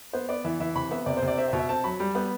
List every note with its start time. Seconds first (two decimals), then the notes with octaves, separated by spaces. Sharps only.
0.13 B3 C5
0.29 B3 D5
0.45 E3 E5
0.60 E3 E5
0.76 C3 B5
0.91 B3 E5
1.06 C3 D5
1.17 C5
1.22 C3
1.27 D5
1.38 C4 E5
1.48 E5
1.53 B2
1.59 E5
1.69 C4 A5
1.84 F#3 B5
2.00 G3
2.15 B3